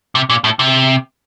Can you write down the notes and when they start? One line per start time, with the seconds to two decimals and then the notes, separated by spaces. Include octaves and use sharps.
0.15 C3
0.30 A#2
0.44 A2
0.59 C3